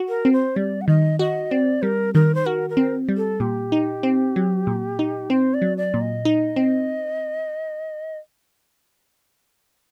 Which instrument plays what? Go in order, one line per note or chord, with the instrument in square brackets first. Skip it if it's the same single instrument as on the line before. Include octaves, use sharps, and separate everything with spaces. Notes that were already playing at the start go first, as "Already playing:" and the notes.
Already playing: [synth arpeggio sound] F#4
[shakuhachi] A#4
[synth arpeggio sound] C4
[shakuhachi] C5
[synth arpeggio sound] G3 [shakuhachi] D5
[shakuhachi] F#5
[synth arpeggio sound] D#3 [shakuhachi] D#5
[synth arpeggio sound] F#4 [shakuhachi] D#5
[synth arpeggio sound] C4 [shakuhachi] D5
[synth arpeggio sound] G3 [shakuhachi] A#4
[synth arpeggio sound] D#3 [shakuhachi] A#4
[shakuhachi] C5
[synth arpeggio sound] F#4 [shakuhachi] A#4
[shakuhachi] A#4
[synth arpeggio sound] C4
G3
[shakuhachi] A4
[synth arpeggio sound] A#2 [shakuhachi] G4
[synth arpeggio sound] D#4
C4
F#3
A#2
D#4
[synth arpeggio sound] C4 [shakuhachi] C5
[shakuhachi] D5
[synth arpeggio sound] F#3
[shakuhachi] D5
[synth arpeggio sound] A#2
[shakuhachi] D#5
[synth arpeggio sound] D#4
C4